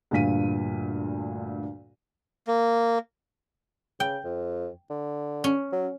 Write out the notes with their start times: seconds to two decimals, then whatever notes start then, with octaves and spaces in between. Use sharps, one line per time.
0.11 D2 G2 A#2 F5 B6 D#7
2.47 A#3
4.00 C#3 G5
4.24 F2
4.90 D3
5.44 C#4
5.72 F#3